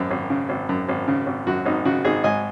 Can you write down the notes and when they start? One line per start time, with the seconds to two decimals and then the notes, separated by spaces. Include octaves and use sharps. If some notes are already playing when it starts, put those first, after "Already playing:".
Already playing: G#1 F#2
0.10 G#1
0.30 C#3
0.49 G#1
0.69 F#2
0.89 G#1
1.08 C#3
1.26 G#1
1.47 F#2 F#4
1.65 G#1 D#4
1.85 C#3 F#4
2.04 G#1 D#4 G#4
2.24 G#2 D#5 G#5